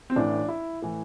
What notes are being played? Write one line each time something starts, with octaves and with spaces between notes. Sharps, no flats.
C4
A1 A2 E3 D4
E4
A2 E3